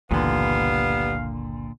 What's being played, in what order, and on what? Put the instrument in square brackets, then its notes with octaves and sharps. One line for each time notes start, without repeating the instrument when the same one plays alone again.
[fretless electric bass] G1 C#2 E3 [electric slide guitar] A#2 D3 [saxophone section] G3 B3 [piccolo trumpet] F5